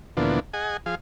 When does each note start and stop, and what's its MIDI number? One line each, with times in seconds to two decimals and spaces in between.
0.17 0.40 38
0.17 0.40 46
0.17 0.40 52
0.17 0.40 53
0.17 0.40 59
0.17 0.40 62
0.53 0.77 68
0.53 0.77 75
0.53 0.77 78
0.53 0.77 80
0.86 0.95 53
0.86 0.95 68
0.86 0.95 77